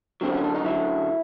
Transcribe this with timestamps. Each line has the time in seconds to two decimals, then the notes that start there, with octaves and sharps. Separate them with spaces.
0.21 F#2 D3 F#3 C4
0.34 C#4
0.44 D4
0.55 D#4
0.64 F#2 D3 F#3 E4